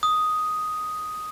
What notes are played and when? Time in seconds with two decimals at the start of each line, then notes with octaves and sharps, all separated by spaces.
0.03 D#6